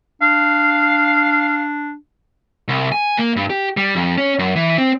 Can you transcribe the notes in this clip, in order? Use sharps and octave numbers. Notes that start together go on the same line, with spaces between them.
D4 F5
C2
G#5
A#3
G2
G4
G3
F2
C#4
F#2
E3
C4